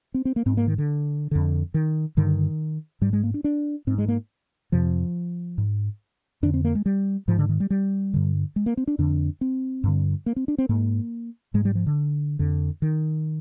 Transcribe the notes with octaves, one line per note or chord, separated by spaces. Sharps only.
C4
C4
A#3
G#2 C4
A#3
D#3
D3
F2 D3
D#3
G2 D3 D#3
G#2 G3
G#3
A#3
D4
D4
G#2 C4
G#3
A#3
F2 C3 F3
G#2
F2 D3 D4
C4
A#3
G#3
G3
G#2 F3
D3
D#3
G3
G3
G2 D3
G#3
A#3
C4
D4
F2 D3 D4
C4
G2 D3
A#3
C4
D4
C4
G#2 A#3
G#2 G#3
G3
F3
D3
F2 D3
D#3